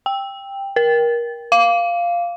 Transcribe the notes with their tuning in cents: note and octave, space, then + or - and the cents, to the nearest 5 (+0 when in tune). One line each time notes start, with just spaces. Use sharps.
G5 +10
A#4 +25
F5 -5